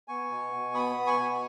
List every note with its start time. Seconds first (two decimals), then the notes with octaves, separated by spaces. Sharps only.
0.08 B3 G#5 C#6
0.30 B2
0.53 B2
0.74 B3 B5 D#6
0.96 B3
1.07 G#5 C#6
1.18 B2